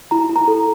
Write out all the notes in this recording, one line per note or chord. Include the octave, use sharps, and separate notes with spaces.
E4 A#5
E4
A#5
A4